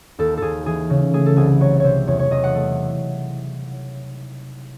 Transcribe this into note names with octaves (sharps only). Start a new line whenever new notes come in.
D#2 A4
D#2 G#4 A4
E3 G#4
C#3
A3 G#4
A4
C2 G#4
F#3 C#5
C3 C5 C#5
E2 C#5
C#5
E2 D#5
F#5
A3